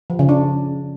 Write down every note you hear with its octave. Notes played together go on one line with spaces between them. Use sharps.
F3
C#3
D4